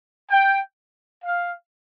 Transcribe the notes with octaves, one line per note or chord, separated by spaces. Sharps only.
G5
F5